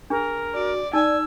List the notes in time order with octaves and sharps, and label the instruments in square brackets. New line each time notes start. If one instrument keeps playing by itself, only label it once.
[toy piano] D4 G#4 [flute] A#4
[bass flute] F#4 [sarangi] D5
[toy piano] D#4 [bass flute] D5 [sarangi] G#5 [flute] E6